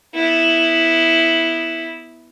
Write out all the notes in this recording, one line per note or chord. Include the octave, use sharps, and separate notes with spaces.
B3 E4